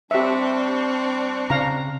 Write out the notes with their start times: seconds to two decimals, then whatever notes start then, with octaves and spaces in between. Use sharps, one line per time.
0.11 G3 C4 D4 G4 E5 C#6
1.50 C#3 F5 A#5